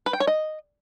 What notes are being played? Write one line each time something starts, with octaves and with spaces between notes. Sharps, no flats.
B4
G5
C#5
D#5